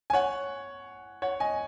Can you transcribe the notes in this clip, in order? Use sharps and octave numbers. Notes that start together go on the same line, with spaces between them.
G#5
C#5 F#5
C#5 F#5
D#5 G#5